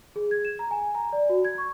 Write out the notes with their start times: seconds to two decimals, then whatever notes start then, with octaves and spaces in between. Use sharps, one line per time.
0.16 G#4
0.31 G#6
0.45 E7
0.59 A#5
0.71 G#5
0.95 A#5
1.13 D5
1.29 F#4
1.45 G#6
1.58 C#6